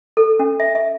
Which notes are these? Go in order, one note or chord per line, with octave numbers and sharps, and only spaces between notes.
A4
C#4
E5
E5